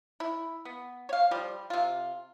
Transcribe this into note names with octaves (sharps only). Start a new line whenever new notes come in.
E4
B3
C#5 F5
F3 G3
C3 F4